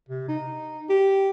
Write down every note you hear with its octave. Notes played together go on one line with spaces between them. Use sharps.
C3
D#4
G4